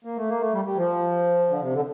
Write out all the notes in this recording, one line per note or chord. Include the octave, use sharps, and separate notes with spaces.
A#3
A3
A#3
A3
G3
G3
F3
D3
C3
D3